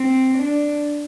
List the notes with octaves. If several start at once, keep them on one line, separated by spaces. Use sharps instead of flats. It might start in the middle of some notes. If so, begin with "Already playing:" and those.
Already playing: C4
D4